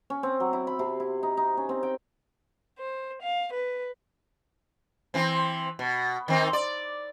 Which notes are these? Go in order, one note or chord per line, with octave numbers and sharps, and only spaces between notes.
C#4
C4
F#3
E4
B5
C3
E4
D#4
D#4
C#4
C4
G5
C5
F5
B4
E3 C4
B2
D#3 C4 D#4
D5